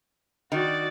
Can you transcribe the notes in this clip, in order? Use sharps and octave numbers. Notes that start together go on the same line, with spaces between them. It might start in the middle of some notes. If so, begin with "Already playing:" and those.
D#3 F#4 D5